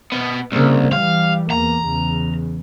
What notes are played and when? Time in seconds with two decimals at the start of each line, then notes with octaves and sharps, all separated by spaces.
0.12 B2 B3
0.52 C2 C#3 A#3
0.93 E3 G3 F5
1.51 E2 A#3 A#5
1.86 E2 C#3